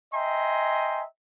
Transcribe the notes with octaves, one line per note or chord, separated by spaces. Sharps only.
D#5 E5 G5 G#5 A#5 C6